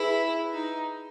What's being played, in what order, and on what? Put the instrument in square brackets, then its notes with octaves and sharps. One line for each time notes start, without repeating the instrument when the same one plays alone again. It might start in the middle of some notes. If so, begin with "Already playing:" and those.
Already playing: [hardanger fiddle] E4 [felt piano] G#4 B4
[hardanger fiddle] D#4